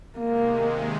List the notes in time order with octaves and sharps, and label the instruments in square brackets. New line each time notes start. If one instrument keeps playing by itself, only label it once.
[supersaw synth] C3 D#3 G#3 [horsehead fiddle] A#3